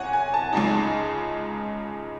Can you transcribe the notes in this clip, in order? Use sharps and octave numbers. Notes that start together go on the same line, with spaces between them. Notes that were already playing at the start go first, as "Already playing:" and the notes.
Already playing: E2 C3 C#5 F#5 G#5
G#5
A5
C#2 C#3 G#3 D#4 A5